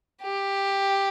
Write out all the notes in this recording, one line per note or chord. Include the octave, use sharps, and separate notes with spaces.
G4